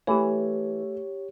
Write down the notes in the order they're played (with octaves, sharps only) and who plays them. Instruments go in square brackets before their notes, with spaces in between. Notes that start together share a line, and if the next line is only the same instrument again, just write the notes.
[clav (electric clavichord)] E3 [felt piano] A3 [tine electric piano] G4 C#5